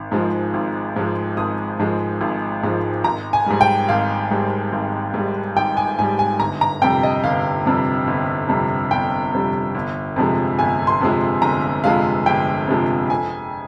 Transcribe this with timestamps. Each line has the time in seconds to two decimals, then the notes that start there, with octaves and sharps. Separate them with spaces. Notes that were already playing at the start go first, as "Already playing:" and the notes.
Already playing: G#1
0.12 G#2 F3 G#3
0.54 G#1
0.96 G#2 F3 G#3
1.37 G#1 D#6
1.79 G#2 F3 G#3
2.21 G#1
2.63 G#2 F3 G#3
3.04 G#1 A#5
3.33 G#5
3.46 G#2 G3
3.61 G5
3.89 G#1 F5
4.30 G#2 G3
4.73 G#1
5.14 G#2 G3
5.56 G#1 G5
5.77 G#5
5.99 G#2 G3 G#5
6.19 G#5
6.40 G1 A#5
6.61 A#5
6.82 F2 C3 G3 G5
7.03 D#5
7.24 G1 F5
7.66 F2 C3 G3
8.07 G1
8.49 F2 C3 G3
8.91 G1 G5
9.33 F2 C3 G3
9.75 G1
10.16 F2 C3 F3 G#3
10.59 G1 G#5
10.87 C6
11.01 F2 C3 F3 G#3
11.42 G1 A#5
11.84 F2 C3 F3 G#3 F5
12.26 G1 G5
12.67 F2 C3 F3 G#3
13.10 F2 G#5